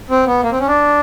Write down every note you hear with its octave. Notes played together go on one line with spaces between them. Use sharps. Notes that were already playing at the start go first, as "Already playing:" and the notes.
C4
B3
A#3
C4
C#4
D4